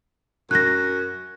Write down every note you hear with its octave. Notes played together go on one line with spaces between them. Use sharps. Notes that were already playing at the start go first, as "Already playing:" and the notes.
F#2 F#6 A#6